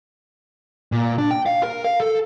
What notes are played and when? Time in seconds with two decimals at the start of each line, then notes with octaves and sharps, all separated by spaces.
0.92 A#2
1.18 D4
1.31 G5
1.46 F5
1.63 A#4
1.84 F5
2.00 A4